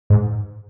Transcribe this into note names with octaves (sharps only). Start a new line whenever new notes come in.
G#2